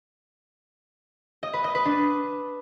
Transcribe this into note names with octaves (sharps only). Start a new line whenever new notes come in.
D#5
B4
D#5
B4
D4